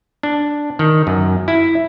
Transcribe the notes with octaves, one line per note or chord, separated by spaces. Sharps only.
D4
D#3
F#2
E4